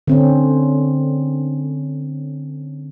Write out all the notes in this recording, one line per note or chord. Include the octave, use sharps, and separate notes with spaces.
D3 C4 C#4